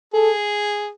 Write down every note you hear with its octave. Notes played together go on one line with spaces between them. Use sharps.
G#4 A4